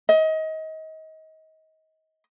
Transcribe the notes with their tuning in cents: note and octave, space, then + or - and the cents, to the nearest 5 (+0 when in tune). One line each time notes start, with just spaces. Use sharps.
D#5 +30